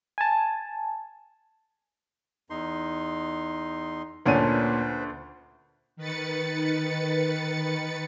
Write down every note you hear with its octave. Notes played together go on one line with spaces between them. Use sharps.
G#5 A5
E2 D#4 C6
D2 A#2 C#4 D4 B4 C5 D#7
D#3 B4 A6 C#7